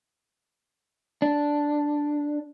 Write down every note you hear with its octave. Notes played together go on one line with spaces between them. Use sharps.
D4